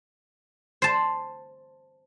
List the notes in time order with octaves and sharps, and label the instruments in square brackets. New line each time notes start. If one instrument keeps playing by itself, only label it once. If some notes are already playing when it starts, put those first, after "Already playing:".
[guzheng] C5 A5